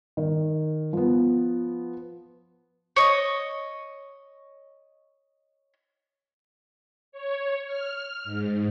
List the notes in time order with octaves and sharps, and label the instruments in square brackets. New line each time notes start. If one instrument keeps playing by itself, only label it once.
[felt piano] D#3
F3 B3
[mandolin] C#5 D#5
[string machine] C#5
F6
G#2